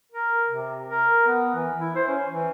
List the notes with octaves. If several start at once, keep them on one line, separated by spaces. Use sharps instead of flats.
A#4
C3
A#4
B3
E3
E4
C5
C#4
E3